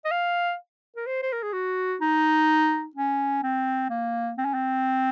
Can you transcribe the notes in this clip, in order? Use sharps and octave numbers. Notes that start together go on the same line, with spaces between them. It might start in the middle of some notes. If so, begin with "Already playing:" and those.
D#5
F5
A#4
C5
C5
A#4
G#4
F#4
D#4
C#4
C4
A#3
C4
C#4
C4